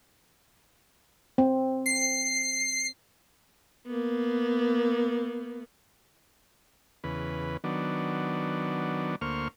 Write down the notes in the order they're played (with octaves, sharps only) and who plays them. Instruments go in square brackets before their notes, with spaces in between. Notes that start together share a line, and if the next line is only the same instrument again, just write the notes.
[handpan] C4
[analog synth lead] C7
[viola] A#3 B3
[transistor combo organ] E2 C#3 B4
D#3 F#3 B3 D4
D2 A#3 C5 C#6 F6